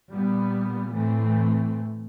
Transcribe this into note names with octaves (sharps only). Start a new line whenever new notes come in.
A#2 G3 B3
A2 E3 A3 C4